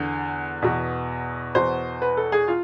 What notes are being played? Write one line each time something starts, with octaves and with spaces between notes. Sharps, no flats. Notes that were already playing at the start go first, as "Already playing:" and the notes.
Already playing: E2 D3
E2 B2
E2 B2 C5
B4
A4
G#4
F4